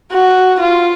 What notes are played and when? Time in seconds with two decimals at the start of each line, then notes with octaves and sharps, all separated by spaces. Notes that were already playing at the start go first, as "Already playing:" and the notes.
0.12 F#4
0.60 F4